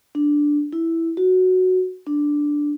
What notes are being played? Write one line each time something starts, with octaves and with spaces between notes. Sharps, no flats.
D4
E4
F#4
D4